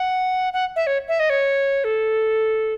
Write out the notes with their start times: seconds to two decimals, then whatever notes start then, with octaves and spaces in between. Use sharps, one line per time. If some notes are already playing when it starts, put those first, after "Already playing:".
Already playing: F#5
0.53 F#5
0.76 E5
0.87 C#5
1.08 E5
1.20 D#5
1.30 C#5
1.84 A4